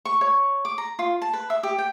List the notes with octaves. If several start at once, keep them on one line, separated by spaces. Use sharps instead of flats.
C#6
C#5
D6
A#5
F4
A5
B4
E5
G4
G5